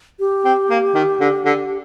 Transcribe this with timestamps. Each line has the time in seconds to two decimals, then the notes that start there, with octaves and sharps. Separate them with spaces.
0.19 G4
0.45 C4
0.70 A#3
0.95 D#3
1.20 D3
1.45 D3